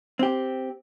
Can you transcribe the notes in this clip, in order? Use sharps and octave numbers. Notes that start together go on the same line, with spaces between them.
C4 G4